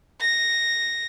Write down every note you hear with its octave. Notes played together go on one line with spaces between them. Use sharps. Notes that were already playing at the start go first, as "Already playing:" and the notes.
A#6